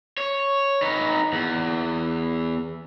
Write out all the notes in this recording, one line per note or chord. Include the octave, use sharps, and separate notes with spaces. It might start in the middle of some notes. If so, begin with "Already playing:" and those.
C#5
D#4 B4
E2